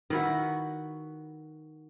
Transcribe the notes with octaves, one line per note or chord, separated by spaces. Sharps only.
D#3 E4 F#4 B4